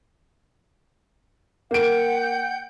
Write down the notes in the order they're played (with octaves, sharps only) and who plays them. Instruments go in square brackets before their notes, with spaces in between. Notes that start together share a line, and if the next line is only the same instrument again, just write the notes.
[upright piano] A#3 D7 [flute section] F#5 G5 G6